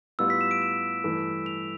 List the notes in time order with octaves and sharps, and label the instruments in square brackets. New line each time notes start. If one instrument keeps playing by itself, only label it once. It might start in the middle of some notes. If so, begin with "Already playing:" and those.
[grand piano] A2 G3 B3 F4 [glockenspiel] E6
[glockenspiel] B6
E7
D7
E7
[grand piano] G2 E3 A3 E4
[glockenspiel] F7